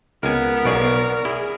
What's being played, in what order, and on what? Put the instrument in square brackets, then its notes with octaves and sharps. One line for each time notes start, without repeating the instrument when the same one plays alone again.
[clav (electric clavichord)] C#2 G#5 [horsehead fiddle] B3 [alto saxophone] A#4
[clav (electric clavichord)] B1 G#4 [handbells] D5 C#6 D7
[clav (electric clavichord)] E4 [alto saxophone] G#4